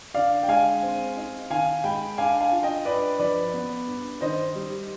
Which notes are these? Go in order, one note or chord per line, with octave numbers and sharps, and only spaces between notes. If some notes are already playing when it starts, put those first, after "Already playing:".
D3 D5 F5
G5
G#3 F5 G#5
C4
D#4
D#3 F5 G#5
G#3 G5 B5
D4 F5 G#5
F5 G#5
F4
D#5 G5
G2 B4 D5
F3 B4 D5
B3
G2
D#3 C5 D#5
G3